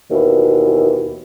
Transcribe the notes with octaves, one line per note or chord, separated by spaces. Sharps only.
D#2 B2 E3